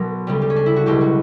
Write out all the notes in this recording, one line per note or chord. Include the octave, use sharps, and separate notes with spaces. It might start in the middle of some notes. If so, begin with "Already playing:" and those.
Already playing: B1 B2 F#3 A#4
D2 C#3 G3
G4
C#4
D4
E4
F#4
C#2 B2 F#3 G4
F#4